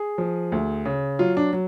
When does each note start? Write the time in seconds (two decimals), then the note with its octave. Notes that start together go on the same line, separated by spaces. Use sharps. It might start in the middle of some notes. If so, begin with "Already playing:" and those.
Already playing: G#4
0.18 F3
0.52 D2
0.85 C#3
1.19 F#3 F4
1.37 D4
1.53 F#3